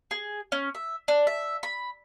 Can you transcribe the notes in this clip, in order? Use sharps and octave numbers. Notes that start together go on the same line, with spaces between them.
G#4
C#4
E5
D4
E5
B5